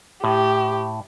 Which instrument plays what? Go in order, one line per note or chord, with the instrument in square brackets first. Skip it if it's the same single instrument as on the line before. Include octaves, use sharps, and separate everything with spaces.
[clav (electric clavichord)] A2 [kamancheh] G4